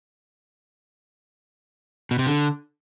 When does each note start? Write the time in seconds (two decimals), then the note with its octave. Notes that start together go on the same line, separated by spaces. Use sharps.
2.11 B2
2.19 C3
2.27 D3